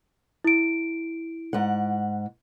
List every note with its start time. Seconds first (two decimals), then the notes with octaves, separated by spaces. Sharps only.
0.44 E4 D7
1.53 G#2 F#5